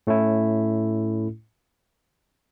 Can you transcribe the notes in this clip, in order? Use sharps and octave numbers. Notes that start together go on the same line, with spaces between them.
A2 A3 C#4 E4